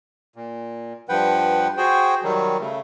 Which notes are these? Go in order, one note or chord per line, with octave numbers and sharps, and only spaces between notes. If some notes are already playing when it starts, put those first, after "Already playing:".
A#2
G2 F3 B4 F#5 G5
F#4 G#4 C5 G5
D#3 F#3 G3
C#3 A3